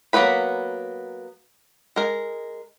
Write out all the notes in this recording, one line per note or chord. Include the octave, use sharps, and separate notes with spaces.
F#3 A#3 B3 B4 B5
G#3 A#4